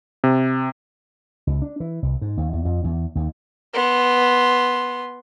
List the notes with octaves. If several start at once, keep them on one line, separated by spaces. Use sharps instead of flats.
C3
C#2
D4
E3
C2
G#2
D#2
E2
F2
E2
D#2
B3 C6